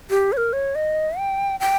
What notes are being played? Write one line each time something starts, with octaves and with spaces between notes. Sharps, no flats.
G4
C#5
A#4
C#5
D#5
G5
G5